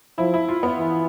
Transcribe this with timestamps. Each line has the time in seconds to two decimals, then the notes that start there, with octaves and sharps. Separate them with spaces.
0.18 F3 E4
0.34 E4
0.49 F4
0.63 B3
0.78 E3